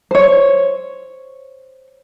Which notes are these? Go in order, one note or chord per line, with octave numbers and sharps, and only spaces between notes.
C5 C#5